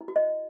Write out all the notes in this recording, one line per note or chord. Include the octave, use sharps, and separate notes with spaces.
E4
F#4
D#5